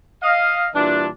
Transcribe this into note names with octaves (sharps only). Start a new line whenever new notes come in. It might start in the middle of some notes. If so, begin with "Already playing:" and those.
D#5 F5
A#2 E3 G3 D4